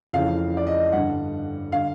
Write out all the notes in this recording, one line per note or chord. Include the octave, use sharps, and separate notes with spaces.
F2 C#3 E3 F5
D5
D#5
G2 D3 F#5
D3 F5